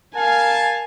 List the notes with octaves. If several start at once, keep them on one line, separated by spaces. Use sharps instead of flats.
A#4 F5 G#5 A5